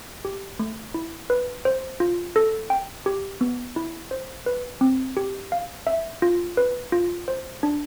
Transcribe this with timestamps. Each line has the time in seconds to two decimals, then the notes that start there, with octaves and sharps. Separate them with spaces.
0.25 G4
0.59 A3
0.94 E4
1.30 B4
1.65 C5
2.00 F4
2.36 A4
2.70 G5
3.06 G4
3.41 B3
3.76 E4
4.11 C5
4.46 B4
4.81 C4
5.17 G4
5.52 F5
5.87 E5
6.22 F4
6.57 B4
6.92 F4
7.28 C5
7.63 D4